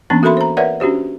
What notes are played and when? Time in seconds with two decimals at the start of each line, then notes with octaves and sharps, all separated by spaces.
0.10 E3 A#3 B3 C#4 D4 A5
0.23 F#4 A4 A#4 E5 B5 C6
0.37 C5 A#5
0.57 A#4 B4 C#5 D5 E5 F#5
0.80 C#4 D4 F#4 G4 C5